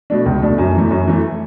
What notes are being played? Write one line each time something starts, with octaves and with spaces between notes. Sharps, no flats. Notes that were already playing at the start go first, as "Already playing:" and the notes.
B2 A3 D4
C#2
B2 A3 D4
F#2
E3 A3
F#2
E3 A3